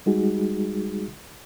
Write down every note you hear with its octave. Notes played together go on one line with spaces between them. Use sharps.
G3 G#3 D#4 F#4 G#4